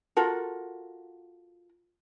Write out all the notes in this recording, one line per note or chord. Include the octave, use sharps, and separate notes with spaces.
F4 F#4 A4 A#4